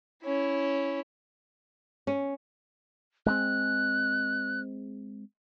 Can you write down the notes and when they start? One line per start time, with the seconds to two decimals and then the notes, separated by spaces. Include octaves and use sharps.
0.24 C#4 E4
2.07 C#4
3.26 G#3 A#3 C4 F#6